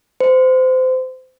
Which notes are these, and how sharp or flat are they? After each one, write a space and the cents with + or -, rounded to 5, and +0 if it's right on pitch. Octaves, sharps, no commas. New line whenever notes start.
C5 -25